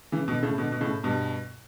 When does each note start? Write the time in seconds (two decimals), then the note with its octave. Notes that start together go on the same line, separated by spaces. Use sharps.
0.12 C#3 E3
0.28 B2 D3
0.43 A2 C#3
0.58 B2 D3
0.72 B2
0.81 A2 C#3
1.04 G2 B2